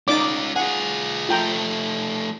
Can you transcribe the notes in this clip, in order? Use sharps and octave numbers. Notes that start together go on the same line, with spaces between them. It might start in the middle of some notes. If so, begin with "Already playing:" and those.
C#4 D#4 F4 D5 D6
F4 G#4 F#5
F3 A3 F4 G5 A#5